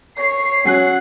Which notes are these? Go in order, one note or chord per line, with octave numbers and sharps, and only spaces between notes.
C#5 C7
F#3 C#4 F#5 G#5 F#6